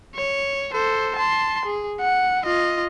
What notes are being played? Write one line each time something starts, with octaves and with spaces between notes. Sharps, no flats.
C#5
A4 C5
A5 C6
G#4
F#5
F4 D#5